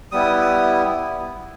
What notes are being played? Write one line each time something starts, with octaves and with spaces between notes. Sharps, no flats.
G3 B3 E4 D#6
D#6